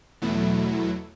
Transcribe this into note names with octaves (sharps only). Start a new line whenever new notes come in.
E2 B2 F#3 A3 E4